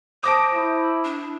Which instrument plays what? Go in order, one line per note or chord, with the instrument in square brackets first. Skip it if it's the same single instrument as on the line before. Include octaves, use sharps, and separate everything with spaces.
[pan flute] C5 [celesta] A5 D6 [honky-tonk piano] D#6 A#6 D7
[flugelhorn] E4
[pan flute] D4